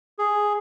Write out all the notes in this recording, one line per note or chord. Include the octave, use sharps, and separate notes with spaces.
G#4